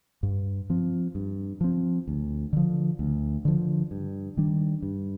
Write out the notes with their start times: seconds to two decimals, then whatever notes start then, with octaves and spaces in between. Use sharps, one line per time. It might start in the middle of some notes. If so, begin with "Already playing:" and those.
0.23 G2
0.70 F3 C4
1.15 G2
1.61 F3 C4
2.08 D2
2.53 D3 F3
2.99 D2
3.45 D3 F3
3.91 G2
4.37 D#3 G3 D4
4.82 G2